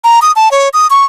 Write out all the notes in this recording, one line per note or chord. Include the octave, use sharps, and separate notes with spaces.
A#5
D#6
A5
C#5
D#6
C#6